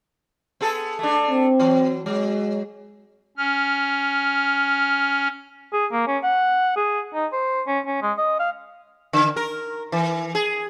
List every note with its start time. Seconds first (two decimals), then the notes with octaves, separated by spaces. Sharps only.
0.61 B3 G#4 A4
0.99 A3 D4
1.30 C4
1.59 E3 F#3
2.06 F#3 G#3
3.37 C#4 F6
5.73 G#4
5.92 A#3
6.07 C#4
6.23 F#5
6.77 G#4
7.14 D#4
7.33 C5
7.67 C#4
7.86 C#4
8.02 G#3
8.18 D#5
8.39 F5
9.13 D3
9.36 A#4
9.92 E3
10.35 G#4